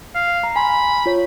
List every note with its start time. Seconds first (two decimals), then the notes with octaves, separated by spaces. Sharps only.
0.15 F5
0.43 A#5
0.56 G#5 B5 C6
1.06 F4 C#5